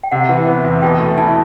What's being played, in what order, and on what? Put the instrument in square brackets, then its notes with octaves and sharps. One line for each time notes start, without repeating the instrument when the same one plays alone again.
[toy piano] G5
[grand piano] C3 [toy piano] F#5
[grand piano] E3
B3
E2
[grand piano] B2 [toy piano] G5
[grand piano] A3
[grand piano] E4 [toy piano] A5